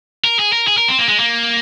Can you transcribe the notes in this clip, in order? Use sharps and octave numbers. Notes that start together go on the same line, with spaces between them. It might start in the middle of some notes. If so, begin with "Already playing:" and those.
A#4
G#4
A#4
G#4
A#4
C4
A#3
G#3
A#3